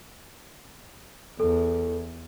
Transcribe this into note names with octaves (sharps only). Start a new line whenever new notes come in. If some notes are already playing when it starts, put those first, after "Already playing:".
E2 A4